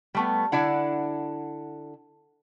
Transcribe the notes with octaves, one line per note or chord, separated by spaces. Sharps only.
G3 A3 B3
D3 D4 E4 F#5